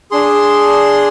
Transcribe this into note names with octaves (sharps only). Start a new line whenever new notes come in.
D4 G#4 C6